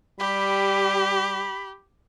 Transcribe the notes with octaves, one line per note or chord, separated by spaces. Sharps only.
G3 G4 B5